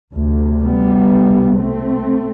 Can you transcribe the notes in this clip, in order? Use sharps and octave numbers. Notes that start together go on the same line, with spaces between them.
D2 C3
G3 B3
C2 B2
A3 C4